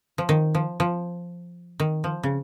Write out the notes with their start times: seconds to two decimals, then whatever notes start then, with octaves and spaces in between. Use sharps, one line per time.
0.18 F3
0.29 D#3
0.55 F3
0.80 F3
1.80 D#3
2.04 F3
2.23 C#3